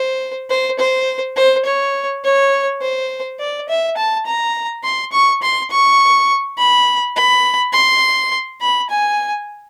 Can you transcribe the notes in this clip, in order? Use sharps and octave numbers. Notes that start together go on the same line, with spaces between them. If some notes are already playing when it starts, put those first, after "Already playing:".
Already playing: C5
C5
C5
C5
C#5
C#5
C5
D5
E5
A5
A#5
C6
C#6
C6
C#6
B5
B5
C6
B5
G#5